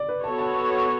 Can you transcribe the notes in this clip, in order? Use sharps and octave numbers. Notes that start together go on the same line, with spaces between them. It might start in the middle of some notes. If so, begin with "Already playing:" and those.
Already playing: D5
B4
B3 F#4 A4 C#5 A5
A5